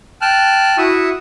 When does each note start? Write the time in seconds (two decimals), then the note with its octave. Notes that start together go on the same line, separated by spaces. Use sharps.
0.22 G5 A5 F6 F#6
0.78 E4 F#4 E5 C#6 D#6